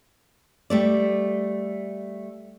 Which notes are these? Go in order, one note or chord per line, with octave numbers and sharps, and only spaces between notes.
G3 A3 D5